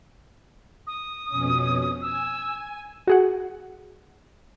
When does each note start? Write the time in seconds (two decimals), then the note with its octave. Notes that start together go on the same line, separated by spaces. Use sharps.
0.87 D#6
1.28 F2 B2 C#4
2.02 G#5 E6
3.07 F#4 G#4 F#5